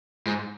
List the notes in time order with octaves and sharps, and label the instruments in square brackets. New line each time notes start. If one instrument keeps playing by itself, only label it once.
[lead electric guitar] G#2